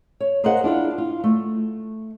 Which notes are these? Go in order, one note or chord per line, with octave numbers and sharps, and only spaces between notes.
C#5
G#4 A#4 C5 D#5 F5 F#5
D4 E4 F4 D5
F4
A3